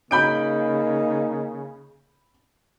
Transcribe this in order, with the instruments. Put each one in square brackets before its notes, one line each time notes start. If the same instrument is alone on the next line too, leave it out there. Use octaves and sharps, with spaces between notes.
[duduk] C#3 [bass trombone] A#3 [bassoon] D#4 [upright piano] B5 G6 D7